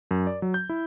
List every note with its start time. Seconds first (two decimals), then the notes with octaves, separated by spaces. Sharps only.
0.11 F#2
0.27 D5
0.42 F#3
0.54 G6
0.69 E4